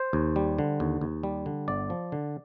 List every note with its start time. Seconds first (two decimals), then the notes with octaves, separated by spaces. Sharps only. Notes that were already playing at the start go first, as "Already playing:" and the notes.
Already playing: C5
0.13 D#2
0.36 G3
0.58 D3
0.80 D#2
1.01 D#2
1.23 G3
1.46 D3
1.68 G1 D5
1.90 F3
2.12 D3